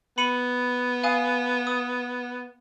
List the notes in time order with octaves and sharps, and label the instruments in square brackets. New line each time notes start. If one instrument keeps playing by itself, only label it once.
[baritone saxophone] B3 [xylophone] B5 C#7 D#7
[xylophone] F5 G#5 D#6
D#6